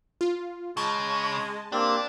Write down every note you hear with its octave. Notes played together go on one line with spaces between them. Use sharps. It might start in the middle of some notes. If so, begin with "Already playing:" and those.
F4
C#3 G#3 A5
A#3 C4 D4 G4